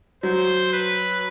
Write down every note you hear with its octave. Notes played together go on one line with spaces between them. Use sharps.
F#3 C5
B4